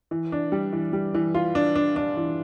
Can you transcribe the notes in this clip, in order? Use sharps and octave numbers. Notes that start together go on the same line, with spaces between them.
E3
D4
G3
E3
G3
E3
F4
D4
D4
D4
E3